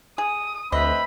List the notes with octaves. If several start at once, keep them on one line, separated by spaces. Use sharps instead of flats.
G#4 D#6
D2 C4 B4 D#5 E5 B5